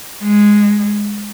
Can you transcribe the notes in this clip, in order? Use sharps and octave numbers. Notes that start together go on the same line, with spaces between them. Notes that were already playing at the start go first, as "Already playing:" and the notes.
G#3